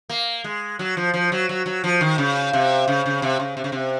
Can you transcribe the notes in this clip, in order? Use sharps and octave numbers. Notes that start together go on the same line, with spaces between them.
A#3
G#3
F#3
F3
F3
F#3
F#3
F#3
F3
D#3
C#3
C3
C#3
C#3
C3
C#3
C3
C#3
C3